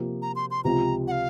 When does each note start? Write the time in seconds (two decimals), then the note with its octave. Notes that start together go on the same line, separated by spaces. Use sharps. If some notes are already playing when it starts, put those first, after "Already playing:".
Already playing: C3 F3 A#3
0.22 A#5
0.36 C6
0.51 C6
0.64 C#2 C3 F3 C4 F4 A#5
1.08 F#5
1.11 F5